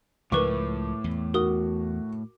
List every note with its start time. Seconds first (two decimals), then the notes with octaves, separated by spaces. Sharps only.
0.32 C#2 A2 F3 A#4 B4 C#6 D6
1.04 E2
1.34 F#4 A#4 D#6